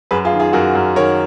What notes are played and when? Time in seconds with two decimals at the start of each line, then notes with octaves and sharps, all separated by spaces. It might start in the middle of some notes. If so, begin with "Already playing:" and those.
0.11 F#2 G#4 B4
0.25 F4 G#4
0.33 D#3
0.40 F4 G#4
0.53 F#2 F#4 A#4
0.75 F#2
0.96 D#3 A#4 C#5